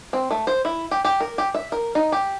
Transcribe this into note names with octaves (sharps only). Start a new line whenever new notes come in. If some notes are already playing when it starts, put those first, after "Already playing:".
C4
A3
C5
E4
G4
G4
A#4
G4
E5
A#4
D#4
G4